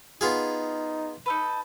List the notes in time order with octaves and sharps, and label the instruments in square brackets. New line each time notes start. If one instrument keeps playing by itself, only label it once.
[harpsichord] B3 F4 G#4 [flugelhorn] D#4
[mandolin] D#4 A4 B4